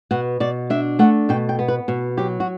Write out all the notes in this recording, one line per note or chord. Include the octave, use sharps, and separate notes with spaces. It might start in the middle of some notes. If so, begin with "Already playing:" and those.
B2 F#5
B2 D5
D4 E5
A3 F#5
B2 G5
G5
B3
B4
B2
F#3 G4
F#4